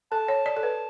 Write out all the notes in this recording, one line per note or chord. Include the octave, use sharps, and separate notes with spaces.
A4 A5
C#5
D5
A4
B4